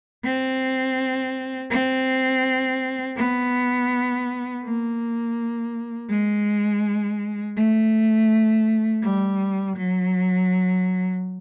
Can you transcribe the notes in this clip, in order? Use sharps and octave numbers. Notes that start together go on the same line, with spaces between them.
C4
C4
B3
A#3
G#3
A3
G3
F#3